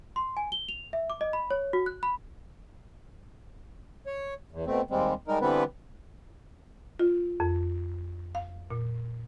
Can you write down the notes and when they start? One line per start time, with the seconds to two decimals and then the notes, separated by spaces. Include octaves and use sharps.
0.16 C6
0.37 G#5
0.52 G7
0.69 F7
0.93 E5
1.10 D6
1.21 D#5
1.33 B5
1.51 C#5
1.73 F#4
1.86 F#6
2.03 B5
4.06 C#5
4.52 E2
4.67 B2 A3 C4
4.91 D#2 G3 G#3 C4
5.28 G3 G#3 D#4 A#4
5.41 D3 E3 G3 B3 C4 B4
6.99 F4
7.40 F2
8.35 F5
8.70 A#2